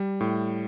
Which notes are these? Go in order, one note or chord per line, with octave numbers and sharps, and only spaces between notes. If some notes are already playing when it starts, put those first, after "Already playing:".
Already playing: G3
A2